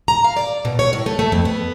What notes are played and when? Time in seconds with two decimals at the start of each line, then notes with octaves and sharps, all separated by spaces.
0.08 A#5
0.24 F5
0.37 D5
0.65 B2
0.79 C#5
0.93 A2
1.06 A3
1.19 A3
1.32 F2
1.45 B3